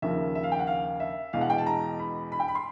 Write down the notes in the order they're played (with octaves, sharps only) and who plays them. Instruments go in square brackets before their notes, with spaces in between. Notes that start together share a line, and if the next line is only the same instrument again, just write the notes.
[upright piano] D#2 C#3 F3 A#3 E5
E5
F5
G5
F#5
F5
E5
E2 B2 G#3 F5
F#5
G5
A5
A#5
B5
B5
G5
B5
C6